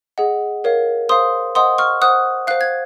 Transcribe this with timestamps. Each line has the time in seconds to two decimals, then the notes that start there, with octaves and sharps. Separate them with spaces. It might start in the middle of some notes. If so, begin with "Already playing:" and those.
0.18 G#4 D#5 F#5
0.64 A#4 C#5 F5
1.09 C5 F5 C6 D#6
1.55 C5 D#5 F#5 C6 D#6
1.78 C#6 F6
2.01 C5 F#5 D#6 F#6
2.47 C5 F5 F#6
2.61 G#6